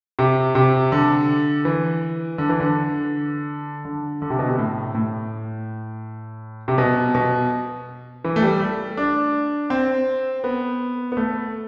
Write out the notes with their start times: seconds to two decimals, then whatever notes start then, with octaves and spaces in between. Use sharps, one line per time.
0.19 C3
0.55 C3
0.92 D3
1.65 E3
2.38 D3
2.49 E3
2.60 D3
3.85 D3
4.22 D3
4.30 C3
4.39 B2
4.49 C3
4.58 A2
4.95 A2
6.68 C3
6.78 B2
7.15 B2
8.24 E3
8.36 A3
8.42 G3
8.60 A3
8.97 D4
9.70 C4
10.44 B3
11.12 B3
11.17 A3